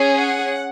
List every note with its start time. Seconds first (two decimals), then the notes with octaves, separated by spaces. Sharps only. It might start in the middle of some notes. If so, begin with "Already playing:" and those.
Already playing: C#4 G#4
0.17 F#5